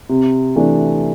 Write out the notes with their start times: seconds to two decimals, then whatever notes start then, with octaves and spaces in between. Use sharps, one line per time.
0.09 C3
0.56 E3 A3 D4